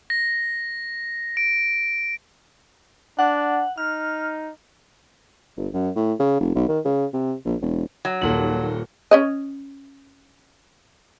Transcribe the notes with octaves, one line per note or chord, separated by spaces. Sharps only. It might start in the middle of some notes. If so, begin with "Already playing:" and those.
A#6
D7
D4 F#5
D#4 F6
G1
F#2
A2
C#3
F1
B1
D#3
C#3
C3
A#1
E1
F#3
D#1 D#2 A#2 A4 F#7
C#4 C#5 D#5